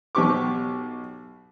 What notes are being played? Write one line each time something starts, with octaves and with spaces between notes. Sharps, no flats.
B1 B2 G4 C#6 D6